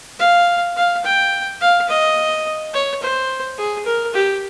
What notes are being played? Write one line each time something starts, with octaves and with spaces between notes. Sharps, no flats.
F5
F5
G5
F5
D#5
C#5
C5
G#4
A#4
G4